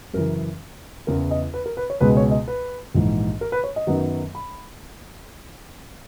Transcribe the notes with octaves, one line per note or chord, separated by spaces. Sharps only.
F#2 C#3 E3 A#4
E2 C#3 E3 B3 A#4
D#5
B4
A#4
B4
C#5
C#2 B2 G#3 B3 B4
C#5
D#5
B4
A#1 G#2 E3
A#4
B4
C#5
D#5
F#2 D#3 F#3 B3
B5